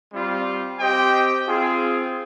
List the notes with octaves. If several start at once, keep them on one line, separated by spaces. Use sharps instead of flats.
G3 C4 F4
C4 G4 C5 D#5 G5
C4 F4 G#4